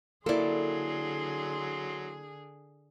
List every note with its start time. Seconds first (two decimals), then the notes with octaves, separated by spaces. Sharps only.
0.26 D3 F#3 A#3 E4 G#4 A4 D5 C6